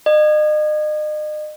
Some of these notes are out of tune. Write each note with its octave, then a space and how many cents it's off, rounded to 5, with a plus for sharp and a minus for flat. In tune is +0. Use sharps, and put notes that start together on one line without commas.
D#5 -40